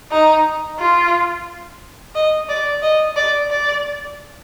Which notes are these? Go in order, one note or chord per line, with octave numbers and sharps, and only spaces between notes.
D#4
F4
D#5
D5
D#5
D5
D5